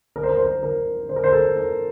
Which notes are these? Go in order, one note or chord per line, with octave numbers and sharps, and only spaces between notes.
A#4
C5
A#4
C5
A#4
A#4
C5
A#4
C5
A4
A#4